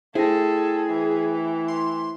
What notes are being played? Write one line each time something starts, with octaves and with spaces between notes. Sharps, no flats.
A3 E4 G#4 A4 C5 G5 A#6
E3
C6